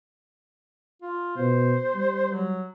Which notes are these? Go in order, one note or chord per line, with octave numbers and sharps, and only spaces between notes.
F4
B2 C5
G3
F#3